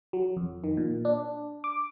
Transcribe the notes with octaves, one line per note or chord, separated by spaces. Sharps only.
F#3
F2
D#3
A#2
D4
D6